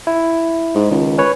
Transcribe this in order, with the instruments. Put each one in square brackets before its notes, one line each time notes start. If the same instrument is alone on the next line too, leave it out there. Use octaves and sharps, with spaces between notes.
[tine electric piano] E4
[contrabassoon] G#2
[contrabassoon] C#2 [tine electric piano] D#3
[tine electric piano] C#4 B4 C#5